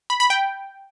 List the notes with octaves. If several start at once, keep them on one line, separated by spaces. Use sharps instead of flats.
B5
B5
G5